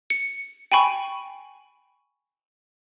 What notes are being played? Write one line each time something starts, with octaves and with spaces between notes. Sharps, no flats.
C#7
G5 G#5 B5 C#6